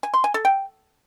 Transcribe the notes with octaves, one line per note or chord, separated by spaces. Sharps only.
G#5
C6
G#5
A4
G5